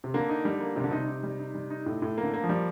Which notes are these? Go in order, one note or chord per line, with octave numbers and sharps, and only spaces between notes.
C3
D3 A#3
D#4
G3
A#3
C3 G3
D3
C3 D#4
D#4
G3
D#4
G3
D#4
A2
A2
A#3
D3
A#3
F3
G3